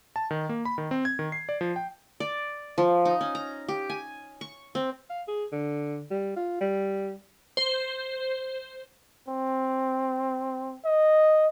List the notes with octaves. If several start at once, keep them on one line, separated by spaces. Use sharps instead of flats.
A5
D#3
A#3
B5
D#3
C4
G#6
D#3
C7
D5
F3
G5
D5
F3
D#4
C#4
A#5
G4
G#5
C#6
C4
F5
G#4
D3
G3
F4
G3
C5
C4
D#5